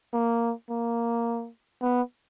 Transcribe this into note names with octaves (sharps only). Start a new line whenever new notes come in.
A#3
A#3
B3